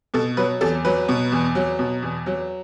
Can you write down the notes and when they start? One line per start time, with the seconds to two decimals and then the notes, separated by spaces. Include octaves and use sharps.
0.14 B2 A4
0.37 F#3 B4
0.61 E2 A4
0.85 F#3 B4
1.08 B2
1.32 E2
1.55 F#3
1.79 B2
2.02 E2
2.26 F#3